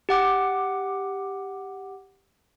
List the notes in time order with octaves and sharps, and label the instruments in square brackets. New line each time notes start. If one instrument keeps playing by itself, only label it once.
[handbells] G4 F#5 D6